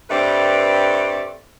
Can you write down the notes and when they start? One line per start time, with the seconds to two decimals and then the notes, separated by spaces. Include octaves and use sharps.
0.09 G2 A3 C4 B4 D5